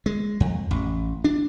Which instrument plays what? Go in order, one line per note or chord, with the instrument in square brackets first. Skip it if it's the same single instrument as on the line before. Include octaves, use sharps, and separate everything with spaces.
[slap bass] G#3
F2
A1
D4